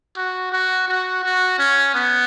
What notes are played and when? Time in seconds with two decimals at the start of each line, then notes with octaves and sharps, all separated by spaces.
0.17 F#4
0.52 F#4
0.88 F#4
1.24 F#4
1.59 C#4
1.95 B3